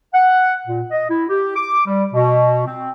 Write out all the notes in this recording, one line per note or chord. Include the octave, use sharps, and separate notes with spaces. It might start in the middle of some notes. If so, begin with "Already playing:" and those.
F#5
A#2
D#5
E4
G4
D6
G3
B2
C4